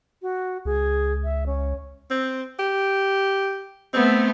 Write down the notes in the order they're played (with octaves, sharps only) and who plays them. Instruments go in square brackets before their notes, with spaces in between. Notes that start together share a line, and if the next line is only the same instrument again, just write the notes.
[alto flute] F#4
[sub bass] C#2 [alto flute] G#4
[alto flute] E5
C#4
[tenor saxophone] C4
G4
[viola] A3 B3 [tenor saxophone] C4